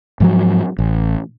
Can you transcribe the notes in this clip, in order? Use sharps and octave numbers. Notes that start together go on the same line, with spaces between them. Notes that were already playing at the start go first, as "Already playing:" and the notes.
G#2 F3 F#3
A1